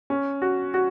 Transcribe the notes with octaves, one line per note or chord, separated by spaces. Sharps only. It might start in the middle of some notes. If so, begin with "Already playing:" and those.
C#4
F#4
F#4